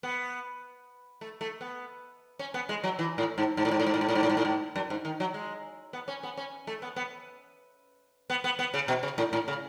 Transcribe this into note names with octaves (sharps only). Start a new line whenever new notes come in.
B3
A3
A3
B3
C#4
B3
G#3
F#3
E3
A2
G#2
G#2
A2
G#2
A2
G#2
A2
G#2
A2
G#2
A2
G#2
A2
G#2
F#2
G#2
D#3
F#3
G#3
B3
C#4
B3
C#4
A3
B3
B3
B3
B3
B3
C#3
B2
C#3
A2
A2
C#3